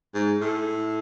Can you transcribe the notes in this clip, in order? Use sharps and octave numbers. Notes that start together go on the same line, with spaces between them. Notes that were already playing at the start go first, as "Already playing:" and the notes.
G#2
A2